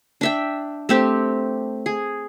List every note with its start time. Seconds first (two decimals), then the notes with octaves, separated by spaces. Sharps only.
0.21 D4 E5 G5
0.89 A3 C4 G4
1.86 G#4